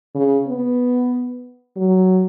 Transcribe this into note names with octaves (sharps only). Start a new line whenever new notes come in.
C#3
B3
F#3